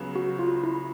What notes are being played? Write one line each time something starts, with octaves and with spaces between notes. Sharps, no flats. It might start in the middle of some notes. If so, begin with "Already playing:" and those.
Already playing: C#2 C#3 F#3 B3
F#4
F4
E4